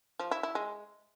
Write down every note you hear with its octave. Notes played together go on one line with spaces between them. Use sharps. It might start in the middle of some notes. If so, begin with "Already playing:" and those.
F3
E4
E4
G#3